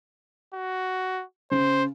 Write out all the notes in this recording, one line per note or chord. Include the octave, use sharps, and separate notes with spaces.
F#4
C#3 C5